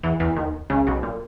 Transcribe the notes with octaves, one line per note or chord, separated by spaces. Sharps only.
E2 E3
E2 E3
D#2 D#3
C#2 C#3
B1 B2
A#2